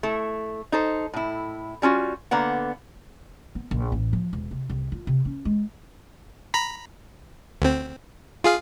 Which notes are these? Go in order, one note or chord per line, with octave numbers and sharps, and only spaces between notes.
A3 E4
D#4 A4 C5
A2 E4
G3 C#4 F4 F#4
D3 A#3 B3 F#5
B3
A#1
A1
F3
E1
C3
C2
F4
C3
C#4
G#3
A#5 B5 B6
D2 C4
F4 G#4 F5